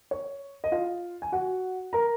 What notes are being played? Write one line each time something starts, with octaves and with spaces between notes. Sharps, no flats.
C#5
D#5
F4 F5
G#5
F#4 F#5
A#4 A#5